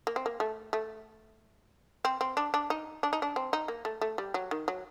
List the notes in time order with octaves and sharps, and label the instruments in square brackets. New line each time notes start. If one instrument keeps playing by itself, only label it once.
[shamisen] A#3
C4
A#3
A3
A3
C4
C4
D4
D4
D#4
D4
D#4
D4
C4
D#4
A#3
A3
A3
G3
F#3
D#3
F#3